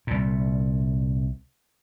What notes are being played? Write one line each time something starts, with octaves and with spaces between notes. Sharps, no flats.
C2 A#2